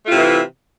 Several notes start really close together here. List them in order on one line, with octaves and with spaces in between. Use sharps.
A3 F4 C3 E4 E3